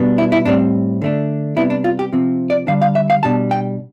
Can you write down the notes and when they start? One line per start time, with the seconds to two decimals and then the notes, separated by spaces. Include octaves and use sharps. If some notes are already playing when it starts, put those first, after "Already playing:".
Already playing: B2 G3 B3 D4
0.18 E4
0.32 E4
0.45 A2 G3 C4 D4
1.02 D3 A3 D4
1.56 C3 G3 B3 D4 E4
1.70 D4
1.84 F4
1.99 G4
2.12 C3 F3 C4
2.50 D5
2.67 D3 G3 D4 F5
2.82 F5
2.95 E5
3.10 F5
3.23 B2 G3 D4 A5
3.51 G5